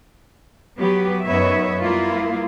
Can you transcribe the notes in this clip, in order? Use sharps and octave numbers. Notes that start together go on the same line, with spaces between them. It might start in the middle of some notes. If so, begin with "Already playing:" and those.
F#3 B3 G4 B4
F#2 B3 D#4 B4 C#5 E5
G3 A#3 B3 E4 F4